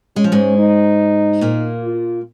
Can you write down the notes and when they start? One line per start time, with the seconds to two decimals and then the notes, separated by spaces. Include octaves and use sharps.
0.16 G#3 C#4
0.24 F3
0.32 G#2 G#3
0.58 D#4
1.41 A#2 A#3
1.83 F4